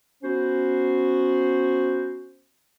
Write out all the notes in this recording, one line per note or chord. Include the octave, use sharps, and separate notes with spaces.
B3 C#4 F#4 C5